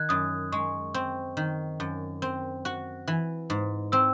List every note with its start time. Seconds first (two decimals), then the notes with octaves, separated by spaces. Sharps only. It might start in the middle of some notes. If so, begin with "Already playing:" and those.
Already playing: D#3 F#6 G#6
0.09 F#2 D#6
0.52 G#3 C#6
0.94 C4
1.37 D#3
1.80 F#2
2.22 C4
2.65 F#4
3.08 E3
3.50 G#2
3.92 C4 E6